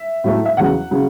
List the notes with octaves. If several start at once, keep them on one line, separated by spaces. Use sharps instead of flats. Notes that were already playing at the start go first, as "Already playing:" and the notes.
Already playing: E5
A2 F#3 A3
E5
E2 C#3 F#3 F#5
C#3 F#3